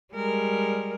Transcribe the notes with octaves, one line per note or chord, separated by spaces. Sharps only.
G3 G#3 A#4